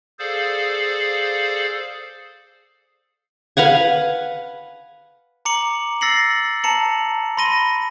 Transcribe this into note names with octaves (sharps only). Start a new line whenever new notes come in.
G#4 A4 C5 D5 F5
B4 F5 F#5 G#5
A#5 D6 C#7 F#7
E6 A6 A#6 C7 C#7 F#7
A5 A#5 C#7 F#7
B5 C6 A#6 D#7 G7